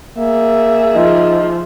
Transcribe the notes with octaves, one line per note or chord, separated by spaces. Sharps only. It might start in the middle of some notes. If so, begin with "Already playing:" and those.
A#3 G#4 E5
F3 D#4